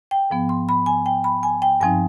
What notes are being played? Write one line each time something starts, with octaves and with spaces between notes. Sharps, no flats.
G5
G#2 F3 B3
C6
B5
G#5
G5
B5
G#5
G5
G2 F3 C4 D#4 G#5